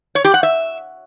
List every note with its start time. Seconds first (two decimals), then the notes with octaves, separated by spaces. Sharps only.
0.15 C#5
0.24 G4
0.34 F#5
0.43 E5